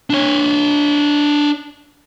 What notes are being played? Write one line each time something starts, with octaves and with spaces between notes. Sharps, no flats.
D4 C#5